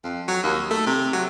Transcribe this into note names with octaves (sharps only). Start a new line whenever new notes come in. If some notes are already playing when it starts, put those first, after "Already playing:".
F2
F#3
D#2
A3
C3
F#3